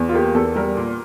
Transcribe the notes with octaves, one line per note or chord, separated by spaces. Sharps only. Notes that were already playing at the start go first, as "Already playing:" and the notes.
Already playing: E2
F4
A#3 G4
E2 A4
G3 A#4
A#2